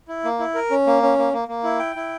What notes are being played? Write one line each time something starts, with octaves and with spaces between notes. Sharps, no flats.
E4
A#3
E4
A#4
C#4
A#3
C#4
A#3
A#3
A#3
E4
G5
E4